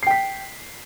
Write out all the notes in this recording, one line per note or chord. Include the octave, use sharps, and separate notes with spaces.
G5 B6 C7